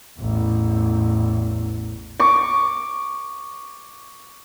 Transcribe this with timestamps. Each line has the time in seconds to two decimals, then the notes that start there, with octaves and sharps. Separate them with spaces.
0.20 A1 E2
2.20 C#6 D6